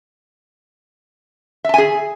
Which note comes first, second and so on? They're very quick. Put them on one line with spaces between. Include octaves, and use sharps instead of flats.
E5 A5 G#5 G#4